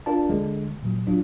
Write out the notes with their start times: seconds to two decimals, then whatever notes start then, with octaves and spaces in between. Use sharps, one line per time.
0.06 D4 F4 A#4 D5 A5
0.29 D3 G#3
0.83 A#2 F#3
1.07 F#3 D4 F4